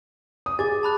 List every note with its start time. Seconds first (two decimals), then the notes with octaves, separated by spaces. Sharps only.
0.46 D#6
0.59 G#4 D6 A6
0.83 A5 B5 F#6